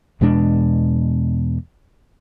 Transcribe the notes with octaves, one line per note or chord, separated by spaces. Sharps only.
E2 B2 G#3 D4